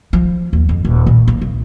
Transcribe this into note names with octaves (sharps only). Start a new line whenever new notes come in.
F3
D#2
F2
D#1
A#2
A#3
C2